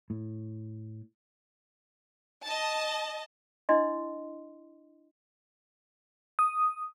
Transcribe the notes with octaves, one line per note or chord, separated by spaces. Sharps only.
A2
D#5 A5
D4 E4 D#5 C6
D#6